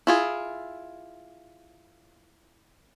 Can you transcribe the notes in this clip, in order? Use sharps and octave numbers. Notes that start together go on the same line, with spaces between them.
E4 F4 G#4